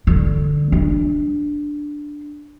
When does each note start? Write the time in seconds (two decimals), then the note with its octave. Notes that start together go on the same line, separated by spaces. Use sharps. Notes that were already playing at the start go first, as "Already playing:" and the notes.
0.07 D3
0.72 D4